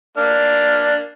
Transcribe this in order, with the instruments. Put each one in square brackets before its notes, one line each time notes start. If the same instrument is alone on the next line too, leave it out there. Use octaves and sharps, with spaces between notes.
[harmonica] A#3 D4 F6